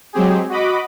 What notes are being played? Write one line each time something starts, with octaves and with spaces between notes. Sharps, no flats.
F#3 G#3 C4 G4 G#4
F#4 D#5 B5 D6